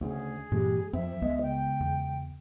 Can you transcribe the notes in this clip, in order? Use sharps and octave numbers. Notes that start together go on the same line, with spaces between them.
D2 C#3 G#4
G2 A#2 E3 G#3 G4
F2 F3 C4 E5
C#2 G#3 B3 D#5
C#3 G5
E2